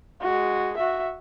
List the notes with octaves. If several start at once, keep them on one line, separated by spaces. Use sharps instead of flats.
G#3 F#4
F#4 E5